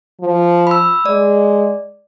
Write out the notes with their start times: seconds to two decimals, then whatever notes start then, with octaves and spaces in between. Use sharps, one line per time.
0.20 F3
0.67 B5 E6
1.06 G#3 D5